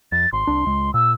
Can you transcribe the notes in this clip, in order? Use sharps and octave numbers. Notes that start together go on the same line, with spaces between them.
F2 A6
G#1 C6
C2 D4
C#2 G#3
A#2 E6